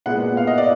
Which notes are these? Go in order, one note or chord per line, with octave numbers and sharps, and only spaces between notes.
A#2 G#3 B3 F#5
F5
D#5
D5